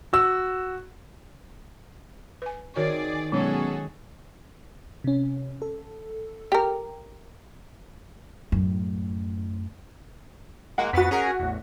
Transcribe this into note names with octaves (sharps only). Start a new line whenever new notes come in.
F#4 E6
B4 G#5
D#3 C4 F#4 G#4 A#4 C#5 D5
B2 F#3 G#3 C#4 F#4 G#4 A4
C3 C#4
A4
G4 A#4
F#2 A2
G#3 A#3 F#4 F#5
F2 B3 F#4 A6 B6
C#4 G#4 A#4
A1 E2